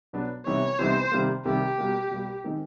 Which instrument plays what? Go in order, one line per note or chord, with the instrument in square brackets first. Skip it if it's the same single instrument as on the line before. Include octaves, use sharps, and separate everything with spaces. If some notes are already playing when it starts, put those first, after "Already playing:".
[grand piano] B2 F#3 B3 D4
[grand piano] C3 E3 G3 B3 D#4 [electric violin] C#5
[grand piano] C3 E3 G3 B3 D#4 [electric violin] C5
[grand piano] C3 D#3 G3 A#3
[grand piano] C3 D#3 G3 A#3 [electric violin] G4
[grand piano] B2 G3 A#3
B2 G3 A#3
D#3 G#3 C4 D#4